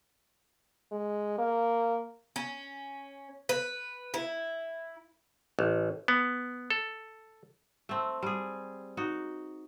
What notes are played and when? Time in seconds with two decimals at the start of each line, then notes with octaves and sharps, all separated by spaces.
0.92 G#3
1.38 A#3
2.36 C#4
3.49 B4
4.14 E4
5.59 A1
6.08 B3
6.70 A4
7.89 A3 C4
8.23 G3 G#4
8.97 D#4 F#4